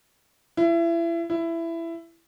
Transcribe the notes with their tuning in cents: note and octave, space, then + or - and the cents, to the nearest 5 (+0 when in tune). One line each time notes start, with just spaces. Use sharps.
E4 +30
E4 +15